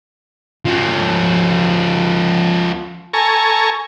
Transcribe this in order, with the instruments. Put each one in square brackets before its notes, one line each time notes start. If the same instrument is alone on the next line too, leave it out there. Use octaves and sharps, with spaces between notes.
[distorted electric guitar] F3 C#4
[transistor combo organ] A4 G#5 A#5 C#6